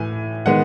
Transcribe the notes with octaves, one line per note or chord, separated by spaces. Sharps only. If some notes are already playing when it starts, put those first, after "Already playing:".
Already playing: A2 E3 G#5
D#3 G#3 B3 F#5